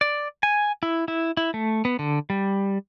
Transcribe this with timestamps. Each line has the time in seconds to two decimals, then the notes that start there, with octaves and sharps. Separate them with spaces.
0.01 D5
0.43 G#5
0.83 E4
1.08 E4
1.37 E4
1.54 A3
1.85 B3
1.99 D3
2.30 G3